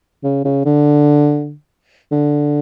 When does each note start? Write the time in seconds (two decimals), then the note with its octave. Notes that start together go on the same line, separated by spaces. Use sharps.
0.24 C#3
0.45 C#3
0.65 D3
2.12 D3